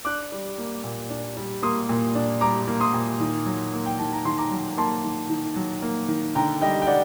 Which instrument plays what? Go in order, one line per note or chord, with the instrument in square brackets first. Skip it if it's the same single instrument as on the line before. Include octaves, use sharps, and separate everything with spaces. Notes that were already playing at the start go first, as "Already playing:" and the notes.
[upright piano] D4 D6 F#6
G3
A#3
A#2
D4
G3
A#3 C6 D#6
A#2
D4
G3 A#5 D6
A#3
C6 D#6
A#2
D#3
F#3
A#3
G5
D#3 A5
A#5
D#3 C6
A#5 D6
F#3
A#3 A5 C6
D#3
D#3
F#3
A#3
D#3
D3 G5 A#5
G3 D#5 G5
G5
D4 D5 F#5